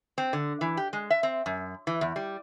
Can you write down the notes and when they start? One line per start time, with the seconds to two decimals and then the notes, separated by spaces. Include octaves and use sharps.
0.18 C4
0.33 D3
0.61 E3
0.77 G4
0.93 G#3
1.10 E5
1.23 C4
1.46 F#2
1.87 E3
2.01 E2
2.16 G3